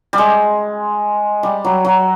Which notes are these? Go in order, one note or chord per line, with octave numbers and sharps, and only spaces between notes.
G3
G#3
G3
F#3
F#3